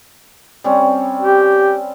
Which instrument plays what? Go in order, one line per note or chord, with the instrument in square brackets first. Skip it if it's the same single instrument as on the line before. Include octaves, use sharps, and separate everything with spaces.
[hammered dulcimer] G3 C4 C#4
[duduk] G4